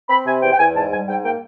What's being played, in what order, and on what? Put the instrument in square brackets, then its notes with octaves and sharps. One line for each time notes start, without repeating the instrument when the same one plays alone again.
[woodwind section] C4 B5
C3 G#5
E2 G5
G5
E2 G#5
G#2 A5
G3 G#5
G#2 G5
A#3 G5